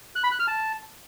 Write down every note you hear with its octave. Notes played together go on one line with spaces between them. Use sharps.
F#6
B5
F#6
F6
A5